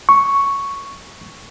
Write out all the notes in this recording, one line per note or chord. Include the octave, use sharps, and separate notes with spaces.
C#6